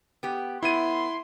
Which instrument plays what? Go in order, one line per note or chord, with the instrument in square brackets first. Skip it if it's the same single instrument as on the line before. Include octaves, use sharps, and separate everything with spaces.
[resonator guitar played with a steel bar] B3 G4
[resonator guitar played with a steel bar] A2 B3 [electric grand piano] E4 D#7 [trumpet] C6